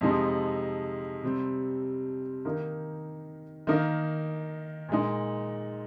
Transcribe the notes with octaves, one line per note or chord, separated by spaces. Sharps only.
F2 C3 F3 G#3 D#4
C3 G3 C4
D#3 A#3 D#4
D#3 A#3 D#4
A#2 G#3 D#4